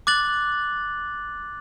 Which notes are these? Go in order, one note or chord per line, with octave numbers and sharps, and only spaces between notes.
D6 F#6 A6 F#7